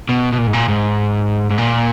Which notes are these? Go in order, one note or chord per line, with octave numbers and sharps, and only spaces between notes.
B2
B2
A#2
G#2
A#2
G#2
G#2
A#2